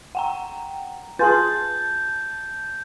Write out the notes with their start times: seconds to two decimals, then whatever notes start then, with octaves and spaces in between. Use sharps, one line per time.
0.15 F#5 G5 A#5
1.19 F4 G#4 B4 G#5 A5 C6 G6 A6